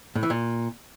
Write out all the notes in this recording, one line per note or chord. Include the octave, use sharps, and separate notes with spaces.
A2
E3
A#2